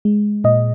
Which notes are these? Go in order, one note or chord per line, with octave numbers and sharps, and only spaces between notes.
G#3
A#2 D#5